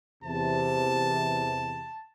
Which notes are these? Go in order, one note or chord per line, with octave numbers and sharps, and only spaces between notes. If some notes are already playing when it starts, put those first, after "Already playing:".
E2 C3 A5